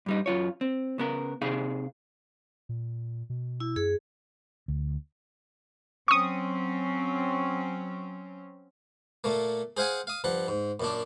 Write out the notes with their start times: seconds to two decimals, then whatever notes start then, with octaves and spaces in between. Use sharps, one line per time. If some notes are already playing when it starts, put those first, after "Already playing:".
0.06 G2 G3 D#4
0.26 F#2 F4 C#5
0.61 C4
0.98 C#3 B3 A#4
1.42 C3 D#4 G#4 F5
2.69 A#2
3.30 B2
3.60 E4
3.76 F#2 G#4
4.68 D2
6.08 F#3 C4 C#4 C#6 D#6
9.24 A#2 A3 A#3
9.77 G#4 C5 F5 F#5 G#5
10.07 F5 D#6
10.24 G2 F3 F#5
10.48 G#2
10.80 F#2 A#2 D4